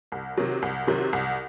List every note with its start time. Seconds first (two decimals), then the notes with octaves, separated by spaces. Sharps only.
0.12 C2
0.37 C3 D#3 F#3
0.62 C2
0.87 C3 D#3 F#3
1.13 C2